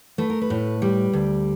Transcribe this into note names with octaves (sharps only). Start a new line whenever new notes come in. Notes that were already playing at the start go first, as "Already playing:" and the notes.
A3 B4
A#4
B4
A2
G3
D2